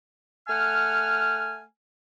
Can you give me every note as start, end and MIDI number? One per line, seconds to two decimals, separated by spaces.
0.48 1.63 57
0.48 1.63 78
0.48 1.63 80
0.48 1.63 89